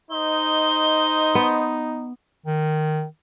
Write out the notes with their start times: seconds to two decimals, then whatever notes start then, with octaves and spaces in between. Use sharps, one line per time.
0.11 D#4 C5 D#5 G7
1.35 B3
2.46 D#3